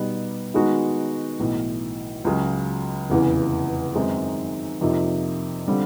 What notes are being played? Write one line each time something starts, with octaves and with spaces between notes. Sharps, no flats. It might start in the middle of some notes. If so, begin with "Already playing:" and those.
Already playing: B2 G3 B3 D#4 G4
D#3 G#3 B3 D#4 F#4
B1 A2 E3
C#2 C#3 F#3
F1 E2 C#3 E3
F#2 D#3 G#3 C4 D#4
F2 C3 F3 A#3 D#4
D3 G3 C4 F4